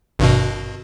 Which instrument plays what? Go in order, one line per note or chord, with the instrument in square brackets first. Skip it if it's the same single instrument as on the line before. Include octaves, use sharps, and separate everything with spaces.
[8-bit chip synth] G#1 G2 B2